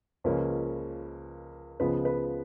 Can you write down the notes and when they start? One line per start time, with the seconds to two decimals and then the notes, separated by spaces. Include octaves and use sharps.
0.24 C#2 C#3 F3 A#3 C#4 B4
1.80 C#2 C#3 F3 B3 B4
2.05 B4